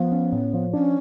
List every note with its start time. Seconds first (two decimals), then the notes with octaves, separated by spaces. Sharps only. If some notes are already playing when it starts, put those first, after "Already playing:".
Already playing: F3 B3
0.12 C#4
0.32 A2
0.54 F3
0.73 C#4 D4